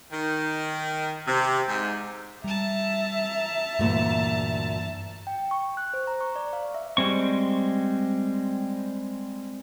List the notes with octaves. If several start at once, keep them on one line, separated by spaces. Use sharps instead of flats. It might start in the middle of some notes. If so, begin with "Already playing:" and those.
D#3
C3
G#2
G3 E5 A5 A#5
D2 G2 A#2 E3
G5
C#6
F#6
C5
A#5
C#6
D5
F5
E5
G3 G#3 C4 C#6